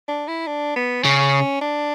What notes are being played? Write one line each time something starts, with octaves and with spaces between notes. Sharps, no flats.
D4
E4
D4
B3
C#3 C#4
D4